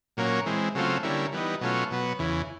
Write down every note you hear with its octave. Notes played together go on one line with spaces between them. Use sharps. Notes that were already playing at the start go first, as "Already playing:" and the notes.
A#2 F#3 A#3 C#4
E3 G#3 C4
C#3 F#3 A3 C4 F4
D3 G3 A#3 C#4 E4
E3 G3 B3 D#4
B2 F#3 A3 C#4 F4
B2 F#3 B3
E2 C#3 E3